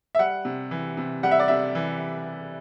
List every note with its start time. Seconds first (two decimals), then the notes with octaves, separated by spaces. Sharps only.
0.15 E5
0.19 G3 F#5
0.45 C3
0.71 E3
0.97 C3
1.23 G3 F#5
1.31 E5
1.39 D5
1.48 C3 E5
1.75 E3